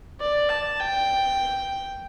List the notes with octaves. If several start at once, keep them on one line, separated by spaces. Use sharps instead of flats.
D5
A5
G5